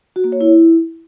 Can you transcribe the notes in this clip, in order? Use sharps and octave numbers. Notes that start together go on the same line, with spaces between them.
F#4
A#3
C#5
E4